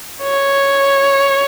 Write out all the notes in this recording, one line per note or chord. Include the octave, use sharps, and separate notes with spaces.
C#5